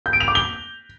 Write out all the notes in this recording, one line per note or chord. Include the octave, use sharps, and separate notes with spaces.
G6
D7
F7
D6
G7